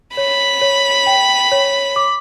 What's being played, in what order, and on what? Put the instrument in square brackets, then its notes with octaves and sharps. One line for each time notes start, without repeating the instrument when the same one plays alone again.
[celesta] C#5 [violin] B5
[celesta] C#5
G5
C#5
D6